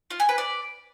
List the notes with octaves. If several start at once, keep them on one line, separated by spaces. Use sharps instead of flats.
F4
G#5
B4
D5